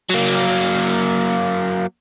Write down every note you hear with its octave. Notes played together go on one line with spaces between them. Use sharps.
F#3 A#3